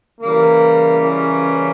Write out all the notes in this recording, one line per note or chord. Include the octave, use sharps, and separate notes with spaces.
C#3 E3 G3 A#3
A#3 C#4